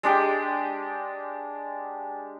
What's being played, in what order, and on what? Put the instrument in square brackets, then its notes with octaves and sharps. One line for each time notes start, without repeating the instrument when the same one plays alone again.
[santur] G#3 D4 G4 G5